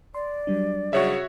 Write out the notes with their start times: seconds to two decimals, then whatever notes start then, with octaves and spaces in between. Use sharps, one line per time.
0.15 D5 C6
0.47 F#3 G3 D4
0.93 C#3 F#4 C#5 E5